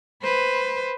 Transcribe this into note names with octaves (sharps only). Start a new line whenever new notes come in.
B4 C5